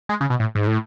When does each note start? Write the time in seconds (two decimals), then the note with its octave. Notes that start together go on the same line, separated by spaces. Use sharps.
0.09 G#3
0.21 C#3
0.30 B2
0.40 A2
0.55 G#2
0.67 A2